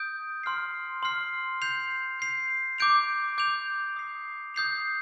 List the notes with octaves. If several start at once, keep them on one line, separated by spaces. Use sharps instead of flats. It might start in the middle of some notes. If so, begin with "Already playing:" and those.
Already playing: D#6 G6 D7
C6 F6 C7
C6 F6 C7
G6 C7 F7
G6 C7 F7
D6 G6 D7 F7
D6 G6 D7 F7
D#6 G6 C7 F7
D#6 G6 C7 F7